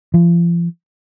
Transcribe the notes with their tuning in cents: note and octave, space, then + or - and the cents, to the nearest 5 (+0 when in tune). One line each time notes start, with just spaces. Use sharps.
F3 -35